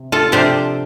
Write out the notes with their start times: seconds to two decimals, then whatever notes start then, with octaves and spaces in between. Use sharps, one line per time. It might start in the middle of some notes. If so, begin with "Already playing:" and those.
Already playing: C3
0.12 F4 A4
0.32 C3 F3 D4 G4 C5